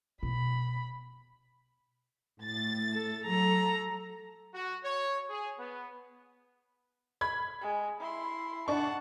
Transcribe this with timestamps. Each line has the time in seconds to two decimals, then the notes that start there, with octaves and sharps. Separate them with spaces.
0.23 B2 B5
2.43 A2 A6
2.93 A4
3.26 F#3 A4 A#5
4.53 F#4
4.83 C#5
5.29 G#4
5.59 B3
7.21 B5 G#6
7.61 G#3
8.00 E4 C6
8.68 D4 F#5 A5 C#6